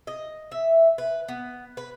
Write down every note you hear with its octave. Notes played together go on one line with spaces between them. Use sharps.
D#5
E5
B4
B3
B4